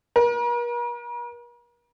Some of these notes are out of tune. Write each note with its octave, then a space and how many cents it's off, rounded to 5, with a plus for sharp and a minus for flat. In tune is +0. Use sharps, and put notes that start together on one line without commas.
A#4 +45